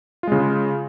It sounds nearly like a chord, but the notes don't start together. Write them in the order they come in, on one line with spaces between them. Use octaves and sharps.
F4 G#3 C#3